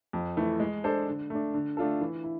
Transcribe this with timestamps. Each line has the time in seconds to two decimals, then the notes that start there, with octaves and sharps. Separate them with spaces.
0.13 F2
0.37 E3 A3
0.60 G#3
0.84 D4 A4 C5
1.07 D3
1.30 A3 D4
1.54 D3
1.77 A3 D4 F4 A4
2.01 E3
2.24 E4